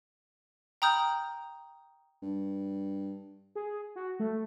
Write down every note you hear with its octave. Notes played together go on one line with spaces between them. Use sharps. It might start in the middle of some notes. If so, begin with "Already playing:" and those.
G5 A#5 B5 D#6 F6 G6
G2
G#4
F#4
A3